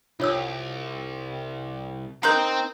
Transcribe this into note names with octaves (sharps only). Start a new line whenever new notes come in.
C2 F4 C#5 E6
C4 D#4 A#4 C5 A#5 F#6 G6